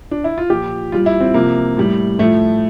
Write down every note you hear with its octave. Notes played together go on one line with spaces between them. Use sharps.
D4
E4
F4
A#2 F3 G4
A#2 G3 F4
E4
C4
C3 F3 A#3
A2 G3
A2 F3 A3